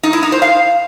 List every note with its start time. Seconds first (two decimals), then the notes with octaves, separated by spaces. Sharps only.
0.03 D#4
0.13 E4
0.23 D#4
0.32 C5
0.42 F5